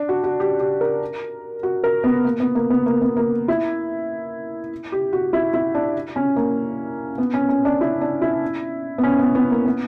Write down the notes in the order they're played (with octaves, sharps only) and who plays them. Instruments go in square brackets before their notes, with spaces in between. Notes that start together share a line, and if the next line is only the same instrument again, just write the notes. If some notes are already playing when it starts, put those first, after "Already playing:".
Already playing: [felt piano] D4
F#4
F#4
G4
G4
A#4
F#4
A#4
B3
A#3
B3
A#3
B3
A#3
B3
A#3
E4
G4
F#4
E4
E4
D4
C#4
A#3
B3
C#4
C#4
D4
E4
D4
E4
B3
C#4
B3
B3
A#3
B3